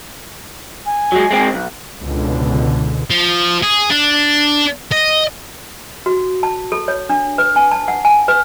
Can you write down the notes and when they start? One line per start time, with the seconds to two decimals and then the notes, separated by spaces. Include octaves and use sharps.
0.86 G#5
1.12 F#3 G#3
1.31 G#3 C4
1.54 B1
2.01 C#2 G#2 B2 D3
3.10 F3
3.63 G#4
3.90 D4
4.92 D#5
6.06 F#4
6.43 A5
6.72 A4
6.88 C#5
7.10 D4
7.38 B4
7.56 G#5
7.71 A5
7.88 F#5
8.05 G#5
8.28 B4